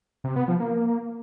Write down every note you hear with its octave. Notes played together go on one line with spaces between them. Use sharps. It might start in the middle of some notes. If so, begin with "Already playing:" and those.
C3
B3
F3
A#3